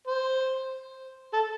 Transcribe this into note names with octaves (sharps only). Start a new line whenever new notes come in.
C5
A4